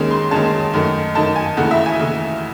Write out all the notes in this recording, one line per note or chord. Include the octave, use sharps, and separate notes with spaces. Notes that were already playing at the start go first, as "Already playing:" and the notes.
Already playing: D#2 D#3 G#3 C#4
C6
D#2 D#3 G#3 C#4 A5
F#2 D#3 A3 D#4
F#2 D#3 A3 D#4 A5
G#5
D#2 C#3 E3 A3 F#5
E5
G#5
D#2 C#3 E3 A3